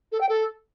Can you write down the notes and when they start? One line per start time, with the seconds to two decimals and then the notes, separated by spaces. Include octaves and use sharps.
0.12 A4
0.21 G5
0.29 A4